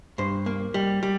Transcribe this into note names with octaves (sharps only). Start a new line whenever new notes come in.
G2 C5
A#3
G3
G3